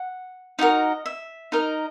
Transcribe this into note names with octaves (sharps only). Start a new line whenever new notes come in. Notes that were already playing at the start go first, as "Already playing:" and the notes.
Already playing: F#5
D#4 F#4 A#4 D#5
E5
D#4 A#4 D#5